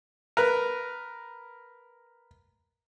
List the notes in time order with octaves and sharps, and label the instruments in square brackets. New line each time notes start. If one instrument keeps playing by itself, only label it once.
[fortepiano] A#4 B4